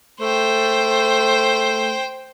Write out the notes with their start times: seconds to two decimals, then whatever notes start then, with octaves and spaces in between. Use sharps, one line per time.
0.21 A3 C5 G5